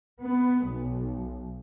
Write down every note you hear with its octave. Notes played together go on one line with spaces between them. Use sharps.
B3
B1